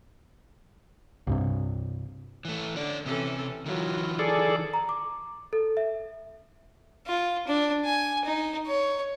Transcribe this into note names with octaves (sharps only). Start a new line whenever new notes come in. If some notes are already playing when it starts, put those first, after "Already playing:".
C2 G2 C3
E3 A3
D3 C#4 D5
C3 E3 C#4 A4
D#3 E3 F#3 F4
G#4 A4 D5
A#5
D6
A4
E5
F4
D4
G#5
D#4
C#5